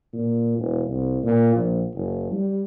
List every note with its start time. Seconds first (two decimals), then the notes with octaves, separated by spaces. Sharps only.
0.13 A#2
0.59 E1
0.88 C2
1.23 A#2
1.55 A#1
1.95 F#1
2.32 G3